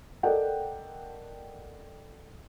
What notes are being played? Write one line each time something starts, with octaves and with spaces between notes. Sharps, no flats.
A4 A#4 D5 D#5 F#5 G5